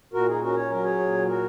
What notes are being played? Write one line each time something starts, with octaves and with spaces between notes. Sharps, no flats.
A#2 F#4 A#4
D#4 G#4
C#4 F#4 A#4
C#5
F#3 A#4
G#4 C#5
A#2
F#4 A#4